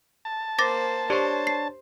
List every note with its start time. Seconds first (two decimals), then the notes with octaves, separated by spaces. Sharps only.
0.25 A5
0.58 A#3 C5 D6 A6 A#6
1.10 D4 G4 C5 C#5
1.47 C7